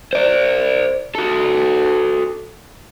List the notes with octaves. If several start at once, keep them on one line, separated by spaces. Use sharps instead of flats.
C5 D5
F#4 A4